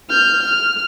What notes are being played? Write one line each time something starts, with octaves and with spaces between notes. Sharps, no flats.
F6 G6
F6